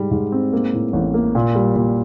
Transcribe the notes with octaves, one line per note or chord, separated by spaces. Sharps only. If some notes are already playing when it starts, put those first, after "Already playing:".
Already playing: G#2 G3
G#2
C4
A#3
A2
A1
A#3
A#2
G3
A#2